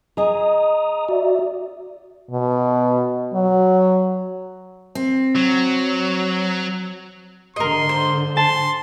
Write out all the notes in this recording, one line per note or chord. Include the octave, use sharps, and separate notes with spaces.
G#4 D#5 A#5 D#6
F#4 D5 E5
B2
F#3
C4
F#3
G#2 D3 A#4 D#5 C6
C5
A5 C6